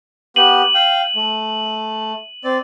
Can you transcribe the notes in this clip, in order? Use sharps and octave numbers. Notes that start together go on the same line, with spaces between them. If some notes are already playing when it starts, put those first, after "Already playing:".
B3 G4 D#7 F#7
F5 G5
A3
C4 D5